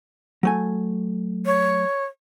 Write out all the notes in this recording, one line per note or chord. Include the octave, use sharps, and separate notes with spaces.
F#3 A3 G#5
C#5